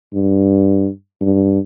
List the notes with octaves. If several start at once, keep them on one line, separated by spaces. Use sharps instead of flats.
G2
G2